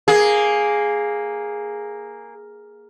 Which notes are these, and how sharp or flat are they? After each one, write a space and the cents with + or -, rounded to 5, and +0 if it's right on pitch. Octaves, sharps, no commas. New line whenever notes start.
A#3 +0 G#4 +0